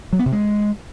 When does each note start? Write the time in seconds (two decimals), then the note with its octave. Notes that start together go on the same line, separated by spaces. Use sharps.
0.13 F#3
0.19 B3
0.26 C3
0.32 G#3